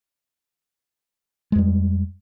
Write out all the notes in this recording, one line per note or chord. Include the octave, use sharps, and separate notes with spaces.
F2 G3 G#3